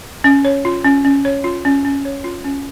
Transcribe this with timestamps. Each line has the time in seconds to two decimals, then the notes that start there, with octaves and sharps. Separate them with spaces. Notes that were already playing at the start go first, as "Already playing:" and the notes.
0.24 C#4
0.45 C#5
0.65 F4
0.84 C#4
1.05 C#4
1.25 C#5
1.44 F4
1.65 C#4
1.85 C#4
2.05 C#5
2.24 F4
2.44 C#4